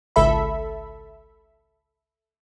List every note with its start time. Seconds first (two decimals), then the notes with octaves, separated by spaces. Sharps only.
0.16 G#1 C#2 A4 E5 B5